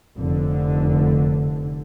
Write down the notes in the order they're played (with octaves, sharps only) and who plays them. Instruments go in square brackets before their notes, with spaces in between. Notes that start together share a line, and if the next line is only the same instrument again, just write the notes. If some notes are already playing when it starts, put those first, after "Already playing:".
[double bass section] F1 D3